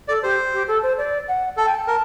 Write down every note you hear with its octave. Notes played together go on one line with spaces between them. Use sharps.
A4 D5
G4 C5
G4
A4
C5
D5
F#5
A4 A5
G5
A5
A#4